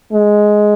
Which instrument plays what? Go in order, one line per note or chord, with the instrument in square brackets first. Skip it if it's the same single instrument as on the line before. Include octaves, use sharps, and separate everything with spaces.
[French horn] G#3